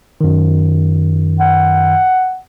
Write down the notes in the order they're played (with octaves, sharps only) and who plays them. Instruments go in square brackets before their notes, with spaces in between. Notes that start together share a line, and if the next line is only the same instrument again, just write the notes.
[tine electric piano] F#2 D#3
[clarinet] F#5